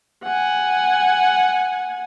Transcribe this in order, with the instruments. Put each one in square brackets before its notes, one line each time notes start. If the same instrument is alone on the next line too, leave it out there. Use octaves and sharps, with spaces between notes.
[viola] F#5 G#5